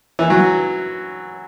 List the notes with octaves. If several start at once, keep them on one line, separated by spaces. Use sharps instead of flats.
E3
F#3